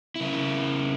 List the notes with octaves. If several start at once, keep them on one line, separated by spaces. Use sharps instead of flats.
C#3 E4